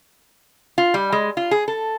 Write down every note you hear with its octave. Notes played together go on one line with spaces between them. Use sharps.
F4
G3
G#3
F4
G#4
A4